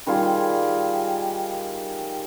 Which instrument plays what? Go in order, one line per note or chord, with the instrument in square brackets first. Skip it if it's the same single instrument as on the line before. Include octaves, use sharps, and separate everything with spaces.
[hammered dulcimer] D#3 G3 F4 G#4